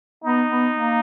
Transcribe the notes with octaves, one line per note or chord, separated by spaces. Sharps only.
B3 D#4
B3
A#3